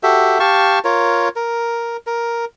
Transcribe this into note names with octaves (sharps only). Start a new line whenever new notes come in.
F#4 G4 A4 E5
G4 F5 A5 C#6
F4 A#4 C#5
A#4
A#4